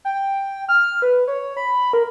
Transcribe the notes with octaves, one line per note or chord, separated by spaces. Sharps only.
G5
F6
B4
C#5
B5
A#4